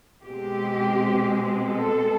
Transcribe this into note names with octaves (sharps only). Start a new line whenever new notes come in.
B2 G#3 C4 G4
A4